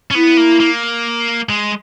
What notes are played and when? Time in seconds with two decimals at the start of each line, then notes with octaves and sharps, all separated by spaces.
0.11 C#4
0.15 B3 E4
0.37 A#3
0.60 A#3
1.49 G#3